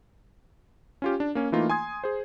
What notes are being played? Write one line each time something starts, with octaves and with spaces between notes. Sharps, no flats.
C#4 F4 G4
D4
A#3 C#4
E3 A3 A#3 D#4 F4
G#5 C6 D#6 G#6
G#4 C5